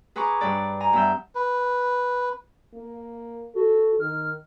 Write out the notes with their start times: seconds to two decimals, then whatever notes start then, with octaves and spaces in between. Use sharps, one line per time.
0.16 G#4 B4 G#5 A#5 C#6 D6
0.41 G2 B4 D5
0.80 G#5 A#5
0.93 G2 B3 E5 G6
1.35 B4
2.74 A#3
3.55 F#4 A4
4.00 D#3 F6